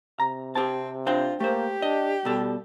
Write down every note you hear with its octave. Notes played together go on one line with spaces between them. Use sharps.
C3 A#5
C4 G4 A5
D4 F4 C5 G5
A3 A#3 G4 C5
D4 D#5
B2 G3 A4